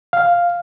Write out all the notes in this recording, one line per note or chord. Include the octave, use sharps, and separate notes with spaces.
F5